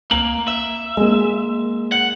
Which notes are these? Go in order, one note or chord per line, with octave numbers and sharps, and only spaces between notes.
A#3 F#7
E5
G#3 A#3
F#5